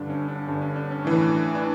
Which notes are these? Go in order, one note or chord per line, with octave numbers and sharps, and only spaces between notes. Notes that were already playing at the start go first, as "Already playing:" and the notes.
Already playing: G2 D3 D4
C#4
D4
G2 D3 C#4
C#4
D4
C#4
A2 E3 D4
D4